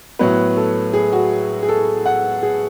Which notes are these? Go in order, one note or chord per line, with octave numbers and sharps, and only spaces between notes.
A2 F#3 B3 B4
A4
G#4
F#4
G#4
A4
F#5
G#4